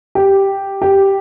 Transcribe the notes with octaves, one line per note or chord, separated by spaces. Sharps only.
G4
G4